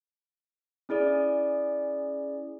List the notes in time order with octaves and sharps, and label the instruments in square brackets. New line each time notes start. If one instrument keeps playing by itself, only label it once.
[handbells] C#4 E4 G#4 D5